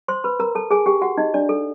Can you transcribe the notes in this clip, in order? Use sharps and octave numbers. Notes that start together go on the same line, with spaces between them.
C5 C6
B4 B5
A#4 A#5
A4 A5
G#4 G#5
G4 G5
F#4 F#5
D#4 D#5
D4 D5
A4